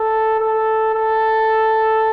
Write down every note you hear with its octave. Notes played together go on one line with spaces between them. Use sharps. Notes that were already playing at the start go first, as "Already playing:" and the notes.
Already playing: A4
A4
A4